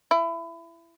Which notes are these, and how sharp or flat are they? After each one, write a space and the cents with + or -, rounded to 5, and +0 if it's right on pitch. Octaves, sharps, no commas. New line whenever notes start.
E4 +25